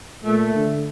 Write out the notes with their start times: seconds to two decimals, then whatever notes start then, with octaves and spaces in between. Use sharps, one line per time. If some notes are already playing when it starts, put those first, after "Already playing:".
0.24 A#2 A3
0.55 D3